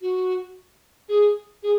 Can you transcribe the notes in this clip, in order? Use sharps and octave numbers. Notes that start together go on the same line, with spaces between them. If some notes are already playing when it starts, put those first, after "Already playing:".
F#4
G#4
G#4